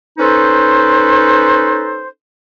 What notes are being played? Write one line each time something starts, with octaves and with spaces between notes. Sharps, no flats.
C#4 D#4 A4 B4 C5